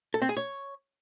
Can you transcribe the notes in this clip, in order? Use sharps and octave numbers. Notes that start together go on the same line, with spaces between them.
A4
C4
G#4
C#5